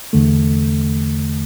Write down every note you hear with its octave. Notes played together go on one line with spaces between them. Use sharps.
E2 D3 A3